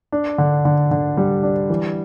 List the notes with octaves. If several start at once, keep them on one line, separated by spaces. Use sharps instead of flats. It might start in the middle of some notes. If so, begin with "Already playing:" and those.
D4
D3
D3
D3
G3
D4
E3